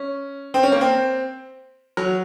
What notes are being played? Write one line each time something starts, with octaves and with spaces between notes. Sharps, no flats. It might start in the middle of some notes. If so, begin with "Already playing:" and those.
Already playing: C#4
C4
C#4
A#3
C4
F#3